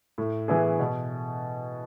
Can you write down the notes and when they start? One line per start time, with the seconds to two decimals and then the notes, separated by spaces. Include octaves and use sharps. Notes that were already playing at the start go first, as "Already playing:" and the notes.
0.18 A2
0.48 E3 B3 E4 G#4
0.79 B2